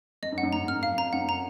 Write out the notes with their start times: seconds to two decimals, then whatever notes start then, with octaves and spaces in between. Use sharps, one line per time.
0.22 F2 D#5
0.32 F#2
0.38 F#5
0.43 F#2
0.52 G#2 A#5
0.68 F#2 F6
0.83 F2 F5
0.98 F2 A#5
1.13 F#2 F#5
1.29 A#5